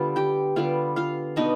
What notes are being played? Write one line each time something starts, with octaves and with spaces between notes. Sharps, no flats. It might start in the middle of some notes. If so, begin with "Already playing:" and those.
Already playing: D3 G3 B3 F4
G4 G5
D3 G3 B3 F4 F5
F4 F5
B2 B3 D4 D#4 D#5